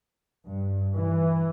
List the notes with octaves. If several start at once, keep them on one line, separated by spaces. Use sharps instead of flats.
G2
E3